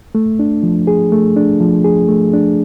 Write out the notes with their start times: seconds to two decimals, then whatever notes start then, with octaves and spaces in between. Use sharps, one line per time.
0.15 A3
0.39 D4
0.63 F3
0.87 G#4
1.12 A3
1.36 D4
1.60 F3
1.84 G#4
2.09 A3
2.33 D4